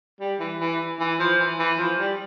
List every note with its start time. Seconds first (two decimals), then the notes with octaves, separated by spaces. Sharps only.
0.20 G3
0.40 E3
0.60 E3
0.99 E3
1.20 F3
1.39 E3
1.59 E3
1.78 F3
1.98 G3